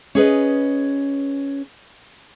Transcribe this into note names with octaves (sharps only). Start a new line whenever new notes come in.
C#4 G#4 B4 D#5